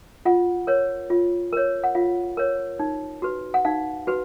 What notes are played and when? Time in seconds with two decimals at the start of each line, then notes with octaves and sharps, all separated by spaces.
0.25 F4 F#5
0.67 A#4 C#5
1.10 F4
1.53 A#4 C#5
1.84 F#5
1.95 F4 F5
2.37 A#4 C#5
2.79 D#4
3.22 F#4 B4
3.54 F#5
3.65 D#4 F5
4.07 F#4 B4